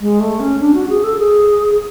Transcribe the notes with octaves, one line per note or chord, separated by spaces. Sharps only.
G#3
A3
C#4
D4
F#4
G#4
A4
G#4